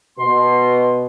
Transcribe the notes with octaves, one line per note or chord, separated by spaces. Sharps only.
B2 C6